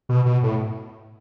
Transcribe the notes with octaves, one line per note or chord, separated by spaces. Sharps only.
B2
B2
A2